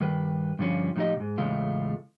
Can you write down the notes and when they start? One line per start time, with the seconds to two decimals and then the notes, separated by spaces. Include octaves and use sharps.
0.01 G2 D#3 B4
0.59 G2 D3 F3 C#4 F4
0.96 A2 F3 D#4 G4 D#5
1.16 G#2 B2
1.38 E2 A2 C#3 G#3 A3 F4